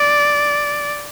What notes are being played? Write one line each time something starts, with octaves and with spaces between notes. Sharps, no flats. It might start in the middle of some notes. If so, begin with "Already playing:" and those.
Already playing: D5